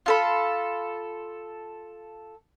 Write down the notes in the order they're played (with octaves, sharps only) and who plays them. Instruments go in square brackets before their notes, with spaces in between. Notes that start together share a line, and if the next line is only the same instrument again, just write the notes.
[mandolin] F4 A4 B5